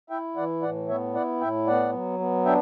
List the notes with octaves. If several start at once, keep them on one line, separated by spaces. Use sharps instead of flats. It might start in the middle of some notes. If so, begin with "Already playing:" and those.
E4 E5 G5
E3 D5 F#5
A2 D5 F#5
B3 C#5 E5
E4 D5 F#5
A2 E5 G5
B3 D5 F#5
F#3
B3
D4 E5 G5